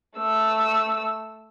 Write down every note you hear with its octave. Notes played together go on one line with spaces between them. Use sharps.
A3 E6